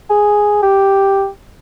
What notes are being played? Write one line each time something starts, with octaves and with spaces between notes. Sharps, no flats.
G#4
G4